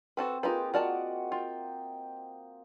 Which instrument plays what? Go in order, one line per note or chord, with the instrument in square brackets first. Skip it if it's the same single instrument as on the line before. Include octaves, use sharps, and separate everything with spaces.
[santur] C4 [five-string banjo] F#4 A4 B4
[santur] A#3 F4 G#4 [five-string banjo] D#4 G4 B4
[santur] F#4 D#5 F#5 [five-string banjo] A#4 D5 A5
[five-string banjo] F4 [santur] G5